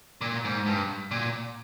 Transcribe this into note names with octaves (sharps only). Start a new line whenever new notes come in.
A#2
G#2
G2
A#2